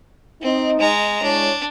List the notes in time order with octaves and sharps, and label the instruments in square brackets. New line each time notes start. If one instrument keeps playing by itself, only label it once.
[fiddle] C4 [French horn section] D#4
[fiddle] G#3 A#5
[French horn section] G#3 E4 C#5 [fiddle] D4